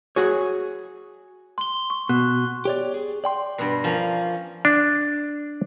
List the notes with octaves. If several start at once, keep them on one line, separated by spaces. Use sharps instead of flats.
F#4 G#4 C#5
C6 G7
C#6
B2 F#6
G4 C#5 D5
G#4
D5 G5 C6
G2 B2
F3 A#3 C#4
D4